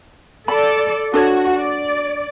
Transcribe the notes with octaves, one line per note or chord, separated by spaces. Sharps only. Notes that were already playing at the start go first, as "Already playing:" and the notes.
A4 D5 B5
D4 F#4 A4 C#5
D5